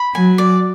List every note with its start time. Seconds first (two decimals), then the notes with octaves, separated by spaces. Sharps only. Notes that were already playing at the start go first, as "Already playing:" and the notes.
Already playing: B5
0.14 F#3 G#5
0.38 D5